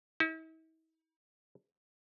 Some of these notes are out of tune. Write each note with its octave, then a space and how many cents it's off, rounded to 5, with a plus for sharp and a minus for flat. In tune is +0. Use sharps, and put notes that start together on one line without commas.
E4 -45